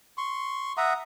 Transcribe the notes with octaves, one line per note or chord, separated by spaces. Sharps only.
C6 C#6
E5 F#5 A#5 D#6